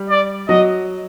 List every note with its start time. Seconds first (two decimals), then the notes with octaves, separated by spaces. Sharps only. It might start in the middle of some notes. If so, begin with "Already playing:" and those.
Already playing: G3 G4
0.10 D5
0.49 F#3 F#4 D#5